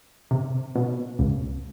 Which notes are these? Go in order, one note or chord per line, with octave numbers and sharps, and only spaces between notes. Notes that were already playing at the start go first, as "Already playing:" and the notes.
C3
B2
C#2